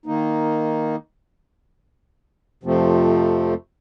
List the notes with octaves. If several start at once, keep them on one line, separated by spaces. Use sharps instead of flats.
D#3 A#3 D#4
F2 C3 F3 A3 C4